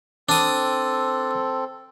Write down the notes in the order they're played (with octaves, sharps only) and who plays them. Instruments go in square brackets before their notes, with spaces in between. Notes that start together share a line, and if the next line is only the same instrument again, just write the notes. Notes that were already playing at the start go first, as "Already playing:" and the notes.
[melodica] C4 A4 [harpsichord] D4 D#6